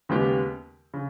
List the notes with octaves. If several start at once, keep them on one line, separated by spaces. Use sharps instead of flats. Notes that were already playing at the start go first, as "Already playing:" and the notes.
D#2 C#3 G#3 B3 G4
C#3